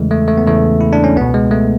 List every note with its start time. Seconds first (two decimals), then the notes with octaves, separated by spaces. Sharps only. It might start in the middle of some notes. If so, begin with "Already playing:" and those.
Already playing: E2 C#3 E3 G#3 A3
0.11 A3
0.28 A3
0.37 B3
0.46 E2 C#3 E3 A3
0.81 E4
0.93 D4
1.04 C#4
1.16 C#2 B2 B3
1.34 G#3
1.51 A3